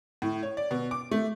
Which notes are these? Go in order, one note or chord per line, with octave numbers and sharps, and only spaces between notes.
A2
C#5
D5
B2
D6
A3